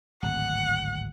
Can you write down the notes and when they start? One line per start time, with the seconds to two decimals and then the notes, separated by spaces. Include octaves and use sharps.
0.22 D1 G#1 F#5